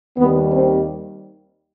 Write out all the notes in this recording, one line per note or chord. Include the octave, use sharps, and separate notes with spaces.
D#2 D#3 G3 B3
C4